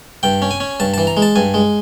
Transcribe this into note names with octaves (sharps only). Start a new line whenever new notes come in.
G2 G5
C#4
G#5
C#4
G2 A5
E3 A5
A#5
G#3
A5
G2 G#5
G#3